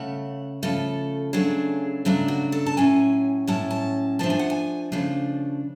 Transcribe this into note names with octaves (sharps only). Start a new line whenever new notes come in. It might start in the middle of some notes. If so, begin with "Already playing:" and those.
Already playing: C#3 A3 F#5
C#3 F3 A3 A4
C#3 F#3 A3 D4 G#4
C#3 F#3 A3 D4
F#4
A4
A5
A2 F#3 C#4 G#5
A2 F#3 C#4 A5
A5
C#3 F3 A3 D4 A5
G#5
F#5
G#5
C#3 F3 A3 D4